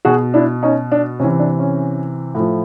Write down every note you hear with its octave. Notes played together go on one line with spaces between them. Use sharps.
B2 F#4 G#4
D4 E4
C#4 D#4
D4
C3 E3 C#4
D4
C#4
A2 F3